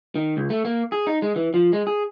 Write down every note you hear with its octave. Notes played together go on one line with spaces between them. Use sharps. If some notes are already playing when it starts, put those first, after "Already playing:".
D#3
C#2
A3
A#3
G#4
D#4
G#3
E3
F3
G#3
G#4